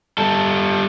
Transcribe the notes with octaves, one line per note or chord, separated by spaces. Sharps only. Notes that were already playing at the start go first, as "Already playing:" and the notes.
G3 A4